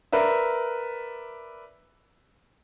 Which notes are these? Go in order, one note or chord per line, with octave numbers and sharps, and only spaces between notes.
A#4 B4 D5 E5